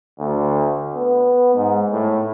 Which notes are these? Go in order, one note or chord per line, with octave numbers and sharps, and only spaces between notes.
D2
B3
G#2
A2